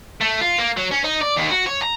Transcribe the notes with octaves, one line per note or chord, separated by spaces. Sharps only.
A3
F4
A#3
F#3
C#4
D#4
D5
D#2
F#4
C#5
A#5